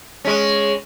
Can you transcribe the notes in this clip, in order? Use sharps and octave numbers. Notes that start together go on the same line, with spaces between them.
G#3 C#4